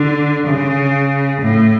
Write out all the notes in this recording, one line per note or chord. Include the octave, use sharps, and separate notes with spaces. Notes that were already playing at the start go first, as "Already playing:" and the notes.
Already playing: D3
C#3
A2